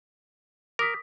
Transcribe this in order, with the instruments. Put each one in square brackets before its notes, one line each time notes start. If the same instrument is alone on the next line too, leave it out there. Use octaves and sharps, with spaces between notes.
[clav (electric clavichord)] A#4 [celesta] D6 D#6 B6